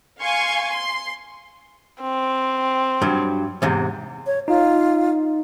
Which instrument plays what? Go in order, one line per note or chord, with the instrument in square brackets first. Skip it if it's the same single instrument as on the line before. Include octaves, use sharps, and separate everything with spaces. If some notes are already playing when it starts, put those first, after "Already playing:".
[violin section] F5 G#5 C6 C#6
C6
[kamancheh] C4
[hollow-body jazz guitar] G2 F#3
E2 G#2 C3
[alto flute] C#5
[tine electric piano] D#4 [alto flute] F4